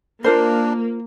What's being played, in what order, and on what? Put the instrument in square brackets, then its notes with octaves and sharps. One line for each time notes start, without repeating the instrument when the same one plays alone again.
[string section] A#3 [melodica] D4 [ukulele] F4 A#4 C5